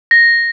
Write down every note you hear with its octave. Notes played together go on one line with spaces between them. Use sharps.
A#6